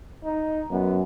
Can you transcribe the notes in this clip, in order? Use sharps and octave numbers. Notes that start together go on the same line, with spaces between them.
D#4
F#2 B3